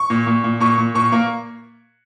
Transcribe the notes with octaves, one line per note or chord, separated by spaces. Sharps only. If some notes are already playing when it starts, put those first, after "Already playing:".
Already playing: C#6
A#2
A#2
A#2
A#2 C#6
A#2
A#2 C#6
A#3